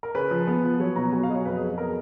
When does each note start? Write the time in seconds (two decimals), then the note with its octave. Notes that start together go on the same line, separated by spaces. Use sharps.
0.03 A#4
0.15 C#3 B4
0.31 F3
0.47 B3
0.64 F3
0.80 F#3 C#5
0.96 B2 A#5
1.12 F#3 G#5
1.23 F5
1.29 F#3 D#5
1.34 C#5
1.45 F2 B4
1.57 G#4
1.61 F2
1.68 G#4
1.78 B3 A#4